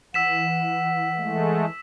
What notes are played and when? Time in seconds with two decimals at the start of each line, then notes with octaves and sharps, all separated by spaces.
0.14 E3 F#5 E6 B6 E7
1.17 G#3 A3